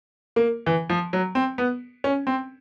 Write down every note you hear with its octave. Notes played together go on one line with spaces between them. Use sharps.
A#3
E3
F3
F#3
C4
B3
C#4
C4